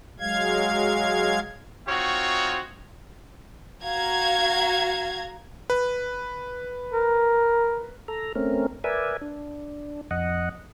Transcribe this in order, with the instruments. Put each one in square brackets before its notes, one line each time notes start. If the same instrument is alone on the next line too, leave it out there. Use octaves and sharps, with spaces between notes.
[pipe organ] F#3 G#3 F5 G#6
[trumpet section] C4 D#4 F4 F#4 C#5
[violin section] F#4 F5 A#5 G#6
[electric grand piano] B4
[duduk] A#4
[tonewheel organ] A4 A#5
A3 C4 C#4 A#4
A#4 B4 D5 E5 G#5
D4
F2 D#5 F#5